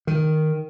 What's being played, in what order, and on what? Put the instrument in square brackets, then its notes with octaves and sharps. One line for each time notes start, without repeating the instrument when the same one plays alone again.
[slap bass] D#3